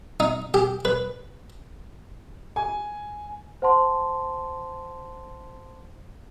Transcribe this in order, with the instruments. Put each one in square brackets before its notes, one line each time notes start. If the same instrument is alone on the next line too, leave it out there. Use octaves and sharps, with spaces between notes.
[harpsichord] D#4
G4
B4
[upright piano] G#5
[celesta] C5 F#5 A5 C6